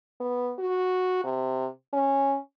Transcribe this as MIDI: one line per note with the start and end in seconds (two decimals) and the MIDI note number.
0.20 0.53 59
0.59 1.20 66
1.24 1.67 48
1.93 2.37 61